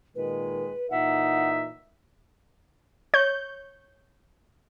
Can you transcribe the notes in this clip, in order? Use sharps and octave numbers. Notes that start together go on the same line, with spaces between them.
A#2 D#3 G#3 B4
A#2 E3 D#4 E5 F#5
C#5 G6